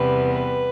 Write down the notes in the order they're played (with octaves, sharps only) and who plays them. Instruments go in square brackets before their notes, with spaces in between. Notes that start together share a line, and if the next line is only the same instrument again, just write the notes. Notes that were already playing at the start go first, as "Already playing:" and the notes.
Already playing: [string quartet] E2 C3 G3 B3 B4
B4